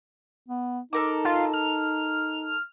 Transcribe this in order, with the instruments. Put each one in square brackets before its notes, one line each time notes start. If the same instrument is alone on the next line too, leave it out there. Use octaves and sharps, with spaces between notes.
[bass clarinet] B3
[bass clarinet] D#4 [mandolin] A4 A#4 D6
[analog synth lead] F4
F6